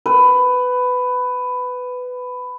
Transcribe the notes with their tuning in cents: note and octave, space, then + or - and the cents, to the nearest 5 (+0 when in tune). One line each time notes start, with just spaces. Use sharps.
B4 +15